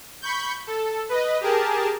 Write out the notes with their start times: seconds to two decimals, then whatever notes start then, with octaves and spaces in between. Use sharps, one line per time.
0.21 B5 C#6 G6
0.67 A4
1.09 B4 D#5
1.41 G4 G#4 A#4 A5